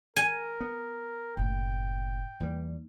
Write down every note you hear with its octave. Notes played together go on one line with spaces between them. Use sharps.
A#4 G#5
B3
F#1 A2 G5
E2 E3 G3 A#3 D#4